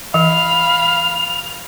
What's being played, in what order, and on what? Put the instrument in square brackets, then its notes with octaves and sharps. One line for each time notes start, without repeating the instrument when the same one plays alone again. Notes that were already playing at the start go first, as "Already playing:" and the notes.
[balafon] E3 [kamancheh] F5 B5 [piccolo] F7